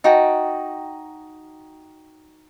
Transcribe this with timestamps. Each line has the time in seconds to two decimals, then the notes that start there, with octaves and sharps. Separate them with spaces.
0.04 D#4 F#4 G5 A5